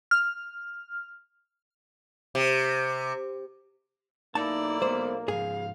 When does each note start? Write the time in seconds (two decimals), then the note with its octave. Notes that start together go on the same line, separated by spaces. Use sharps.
0.11 F6
2.35 C3
4.35 B1 A#3 D#4 E4 D5 A5
4.82 G#3 B3 C5
5.28 G#2 F3 G#4 F5 G#5